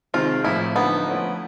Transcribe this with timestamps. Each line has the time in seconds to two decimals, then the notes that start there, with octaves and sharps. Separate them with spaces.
0.14 C3 D#3 G#3 C4 F4
0.44 A2 F3 A#3 E4
0.75 D3 F3 A#3 B3 D#4
1.06 F3 A3 C#4 E4